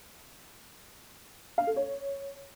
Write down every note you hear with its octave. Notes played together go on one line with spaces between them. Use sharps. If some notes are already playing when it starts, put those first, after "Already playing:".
F5
A4
C#5